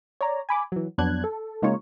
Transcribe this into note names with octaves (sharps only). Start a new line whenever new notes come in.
C#5 D5 A#5
G#5 B5 D6
E3 F#3
F2 F#3 B3 D4 F#6 G#6
A4
C#3 G#3 A#3 D#4 F4 C#5